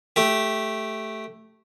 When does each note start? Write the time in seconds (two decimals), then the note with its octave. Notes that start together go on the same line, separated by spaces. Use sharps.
0.16 A3 G4